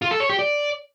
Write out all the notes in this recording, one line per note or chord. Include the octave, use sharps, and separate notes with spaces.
F4
A4
C#5
G4
D5